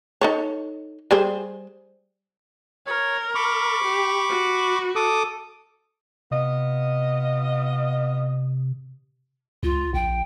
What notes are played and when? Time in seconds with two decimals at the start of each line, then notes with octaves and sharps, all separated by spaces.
0.21 D#4 A4 C#5
1.11 G3 G#4 C5
2.87 A#4 C#5
3.35 B5 C#6 D6
3.84 G4
4.29 F#4
4.96 A4 D6 D#6
6.31 C3 B3 F4 D#5
9.63 C#2 F4
9.94 A#1 G5